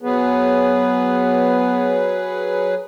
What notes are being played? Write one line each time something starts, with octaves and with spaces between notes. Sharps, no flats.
F#3 B3 G#4 B4